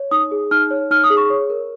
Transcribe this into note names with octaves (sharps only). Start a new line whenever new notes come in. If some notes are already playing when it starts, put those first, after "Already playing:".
Already playing: C#5
D#4 D#6
G#4
D#4 F6
C#5
D#4 F6
D#6
G#4
C#6
C#5
A#4